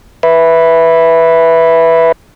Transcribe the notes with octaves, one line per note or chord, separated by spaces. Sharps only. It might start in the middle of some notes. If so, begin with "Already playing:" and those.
B4 E5